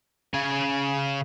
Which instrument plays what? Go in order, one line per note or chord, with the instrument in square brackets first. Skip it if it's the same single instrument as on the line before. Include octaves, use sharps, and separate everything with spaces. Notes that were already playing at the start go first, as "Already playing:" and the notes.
[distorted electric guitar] C#3 G#5